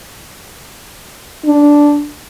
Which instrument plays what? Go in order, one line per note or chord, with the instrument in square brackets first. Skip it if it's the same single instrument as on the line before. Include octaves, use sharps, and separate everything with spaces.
[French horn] D4